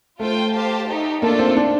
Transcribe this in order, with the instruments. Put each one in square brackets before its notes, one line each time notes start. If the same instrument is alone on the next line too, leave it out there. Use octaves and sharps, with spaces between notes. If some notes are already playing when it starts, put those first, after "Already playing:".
[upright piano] A3 [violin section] F4 C5 G5
[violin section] G4 C5 F5 A5
A3 D#4 G4
[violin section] A3 D4 F4 A4 [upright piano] A#3
[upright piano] C4
D4